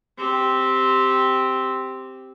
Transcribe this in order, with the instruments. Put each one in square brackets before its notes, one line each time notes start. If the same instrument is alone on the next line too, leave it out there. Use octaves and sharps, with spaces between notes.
[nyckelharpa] C4 G4